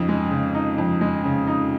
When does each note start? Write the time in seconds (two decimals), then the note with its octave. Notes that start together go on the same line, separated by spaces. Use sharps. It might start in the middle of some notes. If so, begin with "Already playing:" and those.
Already playing: F2 C#3 D#4
0.09 G#3
0.31 C#3
0.55 D#4
0.78 F2
1.01 G#3
1.24 C#3
1.47 D#4